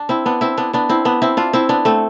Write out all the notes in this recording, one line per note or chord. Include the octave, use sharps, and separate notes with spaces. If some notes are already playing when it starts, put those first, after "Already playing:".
Already playing: D4
C4 E4
B3 D4
C4 E4
B3 D4
B3 D4
C4 E4
B3 D4
C4 E4
D4 F4
C4 E4
B3 D4
A3 C4